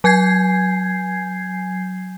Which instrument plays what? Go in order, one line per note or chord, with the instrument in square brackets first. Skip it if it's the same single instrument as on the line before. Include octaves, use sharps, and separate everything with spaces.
[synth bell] F#3 G#5 G6 G#6 C7